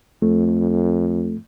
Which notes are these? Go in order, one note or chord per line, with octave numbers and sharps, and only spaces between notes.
F2 A3